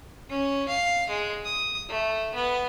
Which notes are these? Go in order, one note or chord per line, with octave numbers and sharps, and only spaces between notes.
C#4
F5
G#3
D#6
A3
B3